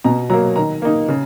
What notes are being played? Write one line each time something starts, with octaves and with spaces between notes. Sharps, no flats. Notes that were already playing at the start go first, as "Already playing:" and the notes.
B2 A#5
F#3 A#3 A#5
D#3 A#5
A#3 D#4
C#3